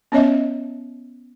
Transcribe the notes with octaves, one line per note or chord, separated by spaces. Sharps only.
B3 C#4 C#5 D#5 E5